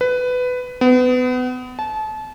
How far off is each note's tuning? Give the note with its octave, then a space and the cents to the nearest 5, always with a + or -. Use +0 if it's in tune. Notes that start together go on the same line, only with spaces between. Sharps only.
B4 +15
B3 +30
A5 -30